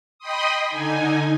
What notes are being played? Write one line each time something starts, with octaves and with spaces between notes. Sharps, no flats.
D#5 G5 B5 C6 D#6
D3 D#4 G#5